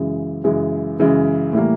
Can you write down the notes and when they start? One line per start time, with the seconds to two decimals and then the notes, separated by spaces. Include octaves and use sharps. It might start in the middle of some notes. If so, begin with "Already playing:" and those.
Already playing: F#2 C#3 E3 G#3
0.44 F#2 C#3 E3 G#3
0.99 F#2 C#3 E3 G#3
1.53 A2 E3 G3 A#3